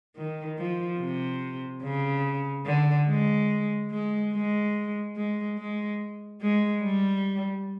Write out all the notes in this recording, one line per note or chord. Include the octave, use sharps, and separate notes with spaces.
D#3
F3
C3
C#3
D3
G#3
G#3
G#3
G#3
G#3
G#3
G3